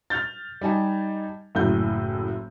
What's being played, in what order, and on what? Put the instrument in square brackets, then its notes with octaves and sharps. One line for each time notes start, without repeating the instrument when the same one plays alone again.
[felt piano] F6 G6 A6
G3 D#4 G#5 A5
F#1 A2 G6